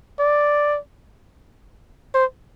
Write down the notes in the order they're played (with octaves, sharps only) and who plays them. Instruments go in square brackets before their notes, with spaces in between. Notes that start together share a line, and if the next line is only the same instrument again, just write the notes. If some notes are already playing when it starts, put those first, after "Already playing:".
[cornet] D5
C5